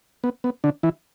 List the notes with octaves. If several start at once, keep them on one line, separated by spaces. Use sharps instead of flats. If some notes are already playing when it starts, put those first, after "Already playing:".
B3
B3
D3 D4
E3 E4